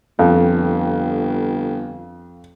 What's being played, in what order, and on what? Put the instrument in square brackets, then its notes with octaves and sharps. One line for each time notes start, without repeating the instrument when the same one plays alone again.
[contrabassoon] G1 [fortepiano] F2